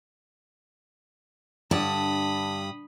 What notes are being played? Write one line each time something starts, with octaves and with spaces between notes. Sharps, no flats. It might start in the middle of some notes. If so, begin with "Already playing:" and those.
G2 D3 D4 G4 A5 B5 D#6